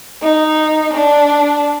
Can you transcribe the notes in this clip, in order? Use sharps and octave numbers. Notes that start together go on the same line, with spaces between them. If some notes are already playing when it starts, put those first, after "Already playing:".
D#4
D4